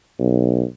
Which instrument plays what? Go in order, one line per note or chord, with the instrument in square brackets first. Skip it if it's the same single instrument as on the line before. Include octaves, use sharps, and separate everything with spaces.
[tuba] B1